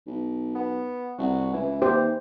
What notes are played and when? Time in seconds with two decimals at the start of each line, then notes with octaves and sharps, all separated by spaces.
0.06 B1
0.55 B3
1.18 C2 F#4
1.53 C#2 E3
1.82 D#2 G4 C5